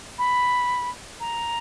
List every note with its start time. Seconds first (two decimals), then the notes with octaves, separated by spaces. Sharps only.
0.19 B5
1.20 A#5